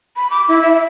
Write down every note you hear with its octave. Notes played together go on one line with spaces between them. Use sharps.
B5
D6
E4
E5
E5